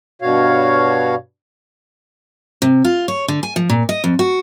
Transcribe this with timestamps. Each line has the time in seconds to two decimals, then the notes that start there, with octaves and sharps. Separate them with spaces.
0.22 G2 B2 F#4 C#5 F5
2.62 C3
2.85 F4
3.08 C#5
3.28 D3
3.43 G#5
3.56 F3
3.70 A#2
3.89 D#5
4.04 F2
4.19 F#4